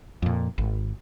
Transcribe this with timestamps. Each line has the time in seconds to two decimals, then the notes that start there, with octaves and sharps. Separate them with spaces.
0.22 F2 A#2
0.58 G#1